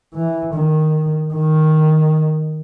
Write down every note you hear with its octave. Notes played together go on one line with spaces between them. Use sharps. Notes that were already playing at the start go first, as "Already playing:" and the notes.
E3
D#3
D#3